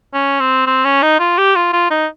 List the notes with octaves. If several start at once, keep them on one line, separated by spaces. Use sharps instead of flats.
C#4
C4
C4
C#4
D#4
F4
G4
F4
F4
D#4